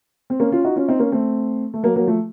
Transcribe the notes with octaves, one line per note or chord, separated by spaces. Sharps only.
C4
A#3 C#4
C#4 F4
D#4 F#4
C#4 F4
C4 D#4
A#3 C#4
A3 C4
A3
F#3 A#3
F#3 A#3
F3 A3